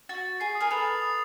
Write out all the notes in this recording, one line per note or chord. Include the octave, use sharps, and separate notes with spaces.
F#4 A6
A6
G#4 C7
D#6
G#4 A#4
A4 B4 F7
D#6
D#6